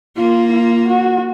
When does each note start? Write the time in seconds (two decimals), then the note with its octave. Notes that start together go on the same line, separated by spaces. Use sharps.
0.16 A#3 F4
0.52 F4
0.88 F#4